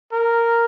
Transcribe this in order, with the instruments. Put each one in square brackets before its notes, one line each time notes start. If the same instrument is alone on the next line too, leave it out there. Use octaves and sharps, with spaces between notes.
[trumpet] A#4